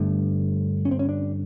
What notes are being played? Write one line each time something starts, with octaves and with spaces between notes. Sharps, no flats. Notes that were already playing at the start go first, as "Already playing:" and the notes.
Already playing: G2 D3 A3
C#4
C4
C#4
D4